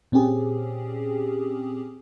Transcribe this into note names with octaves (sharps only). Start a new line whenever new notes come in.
A#2 C4 C#4 G4 G#4